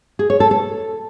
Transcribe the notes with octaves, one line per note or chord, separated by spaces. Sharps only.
G#4
C#5
A4
A4